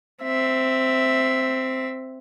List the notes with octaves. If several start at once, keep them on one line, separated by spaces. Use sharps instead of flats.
C4 E5